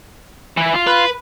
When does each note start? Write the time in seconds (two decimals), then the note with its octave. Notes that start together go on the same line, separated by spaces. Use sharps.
0.57 E3 E4
0.74 F4
0.87 B4